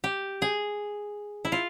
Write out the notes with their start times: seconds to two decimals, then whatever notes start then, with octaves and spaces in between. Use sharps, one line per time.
0.04 G4
0.42 G#4
1.45 E4
1.52 F4